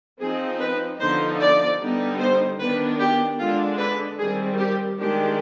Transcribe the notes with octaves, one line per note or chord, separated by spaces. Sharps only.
F3 C4 D#4 G#4
B4
D3 F3 B3 D#4 C5
D5
D3 G3 B3 D#4
C5
D#3 B3 D4 B4
G4
D3 G#3 D4 F4
B4
D#3 G3 C4 G#4
G4
D#3 G#3 D4 G4